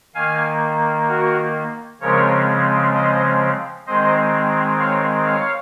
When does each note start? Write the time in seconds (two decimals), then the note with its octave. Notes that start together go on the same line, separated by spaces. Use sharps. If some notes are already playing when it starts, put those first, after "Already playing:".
0.15 D#3 A#3 F5 G#5
1.08 F#4 A#4
2.01 C#3 F3 G#3 C4 A#4 C#5
2.94 C5 D#5
3.87 D#3 G#3 C4 C5 D#5
4.79 C#5 F5
5.25 C#5 F5